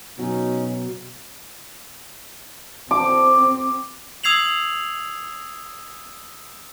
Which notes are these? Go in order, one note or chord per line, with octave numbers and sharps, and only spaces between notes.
B2 F#3 C#4 D#4
C4 D6
D#6 E6 G#6 C7 F7 F#7